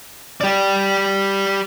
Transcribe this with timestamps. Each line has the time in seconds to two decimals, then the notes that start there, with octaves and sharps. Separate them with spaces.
0.41 G4 D5